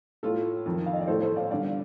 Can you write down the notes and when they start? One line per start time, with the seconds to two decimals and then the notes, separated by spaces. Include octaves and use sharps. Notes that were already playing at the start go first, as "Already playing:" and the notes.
0.23 A2 F4 A4
0.66 F2 D#3
0.86 F5
0.93 D#5
1.01 D5
1.08 A2 A4 C5
1.22 A4 C5
1.36 D5 F5
1.50 G2 D3 D5 F5